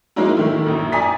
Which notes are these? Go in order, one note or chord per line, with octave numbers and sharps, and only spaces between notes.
F#3 G#3 A#3 C#4 D#4 E4
D#3 A3 E4
A#1 F#2
D5 G#5 A#5 D#6 B6